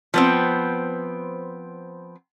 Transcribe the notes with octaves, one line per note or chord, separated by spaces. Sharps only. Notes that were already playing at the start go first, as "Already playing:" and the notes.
F3 B3 C4